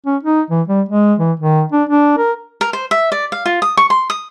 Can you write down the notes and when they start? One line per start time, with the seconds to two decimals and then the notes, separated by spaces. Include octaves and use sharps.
0.06 C#4
0.23 D#4
0.51 E3
0.68 G3
0.89 G#3
1.19 E3
1.40 D#3
1.72 D4
1.89 D4
2.18 A#4
2.61 A#4
2.73 C5
2.91 E5
3.12 D5
3.32 F5
3.46 F4
3.62 D#6
3.77 C#6
3.90 C6
4.10 D#6